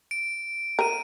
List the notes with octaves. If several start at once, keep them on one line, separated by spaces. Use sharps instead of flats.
D7
A#4 D#7